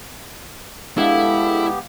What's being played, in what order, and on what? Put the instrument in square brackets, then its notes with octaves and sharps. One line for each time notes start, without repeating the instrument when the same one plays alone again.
[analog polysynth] G#3 D4 A4 [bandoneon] B3 G4 [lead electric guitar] E4 [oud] F5